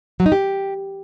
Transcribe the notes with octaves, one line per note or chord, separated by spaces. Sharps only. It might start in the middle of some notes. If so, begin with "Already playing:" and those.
F#3
D#4
G4